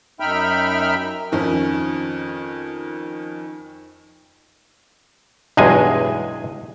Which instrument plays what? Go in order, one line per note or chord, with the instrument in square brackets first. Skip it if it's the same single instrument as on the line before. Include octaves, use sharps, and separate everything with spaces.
[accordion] F#2 D#4 E5 G5 B5 F6
[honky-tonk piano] F2 D#3 C#4
[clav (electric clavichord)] B1 E2 G2 G#3 G#5